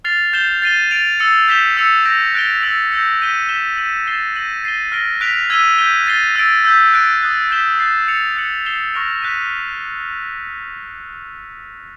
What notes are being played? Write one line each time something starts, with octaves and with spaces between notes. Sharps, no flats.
F6 A6 C7 F7
G6 C7 E7 G7
A6 C7 D#7 G7
A6 D7 F7
E6 A6 C#7
G6 B6 E7 G7
E6 A6 C#7 F7
G6 A#6 D7 F7
F#6 A6 D7 G7
E6 A6 D7 F#7
E6 G6 A#6 C#7
G6 B6 D#7 G7
G6 B6 E7 G7
G6 B6 D#7 F#7
A6 C7 E7 G7
G6 A#6 D#7 F#7
A6 C7 D#7 G7
F6 A#6 D7 G7
F#6 B6 D7 F7
E6 G#6 B6 D#7 G7
G6 B6 D#7 G7
A6 C7 D#7 G7
E6 A6 D7
E6 G6 B6
F#6 A6 D7
D#6 F#6 A6
G6 B6 E7 G7
F#6 A6 C7
A6 C#7 F7
F#6 A6 C#7 F#7
A6 C7 E7 G7
C#6 F6 A#6 D7 F7
F#6 B6 D#7